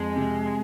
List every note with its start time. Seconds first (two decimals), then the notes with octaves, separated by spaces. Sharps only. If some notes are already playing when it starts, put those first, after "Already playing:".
Already playing: F2 G#3
0.16 C3